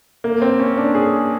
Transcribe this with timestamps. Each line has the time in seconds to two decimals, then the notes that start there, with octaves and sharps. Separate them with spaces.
0.24 A#3
0.42 C4
0.59 C#4
0.78 D4
0.95 G#4